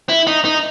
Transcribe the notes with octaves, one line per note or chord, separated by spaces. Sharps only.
E4
D#4
D#4